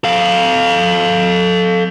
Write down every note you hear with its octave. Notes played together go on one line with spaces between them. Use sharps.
A4 F5